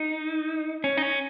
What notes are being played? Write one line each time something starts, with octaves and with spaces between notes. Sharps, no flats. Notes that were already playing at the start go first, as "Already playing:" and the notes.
Already playing: D#4
C#4
D#4
C#4